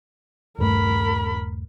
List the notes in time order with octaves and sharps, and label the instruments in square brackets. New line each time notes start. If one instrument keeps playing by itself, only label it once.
[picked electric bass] D#1 G2 A3 [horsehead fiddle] A#4 B5